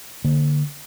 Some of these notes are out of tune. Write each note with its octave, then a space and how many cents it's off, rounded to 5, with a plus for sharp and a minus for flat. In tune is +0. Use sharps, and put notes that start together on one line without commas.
D3 +5 A#3 +0